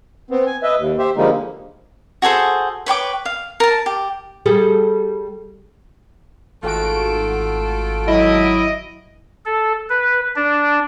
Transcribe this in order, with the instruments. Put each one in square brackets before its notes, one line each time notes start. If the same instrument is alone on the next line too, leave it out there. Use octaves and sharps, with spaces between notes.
[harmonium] B3 C4
G#5
B4 D#5 E5
D#2
G4 C5 E5
D3 F3 G3 G#3 A#3 D#4
[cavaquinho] F#4 G#4 A4 C5
B4 C#5 G5 D6
F5
A#4 A5
G4
[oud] G3 G#4 A4
[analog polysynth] G#1 F#4 D7 [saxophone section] A3 F4 A4
[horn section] F#3 E4 [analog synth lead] D#5
[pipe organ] A4
B4
D4